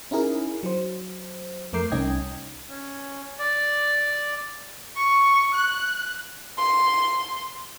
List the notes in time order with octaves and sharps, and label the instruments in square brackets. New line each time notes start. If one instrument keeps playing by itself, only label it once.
[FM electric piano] C#4 D#4 E4 G#4 A#4
F#3 C5
F2 A3 A#4 D6 G6 C7
C2 C#4 D#4 D#5 G5 G#6
[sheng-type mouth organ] C#4
D5
[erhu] C#6
F#6
[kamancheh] C6